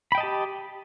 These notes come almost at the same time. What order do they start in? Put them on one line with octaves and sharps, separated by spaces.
B5 G5 D#5 A5 G4